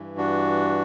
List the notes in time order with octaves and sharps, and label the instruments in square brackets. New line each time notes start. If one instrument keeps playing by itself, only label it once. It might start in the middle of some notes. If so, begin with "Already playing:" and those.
Already playing: [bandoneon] G2 E3
D4 F#4